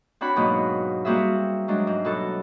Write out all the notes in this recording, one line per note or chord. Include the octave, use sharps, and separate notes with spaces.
C4 D4 F#4 C#5 F#5 B5
G#2 B2 F#3 A#3 B3
G3 A#3 C4 F#4 G#4 E5
F#3 G#3 D4
G#2
B2 F#3 A4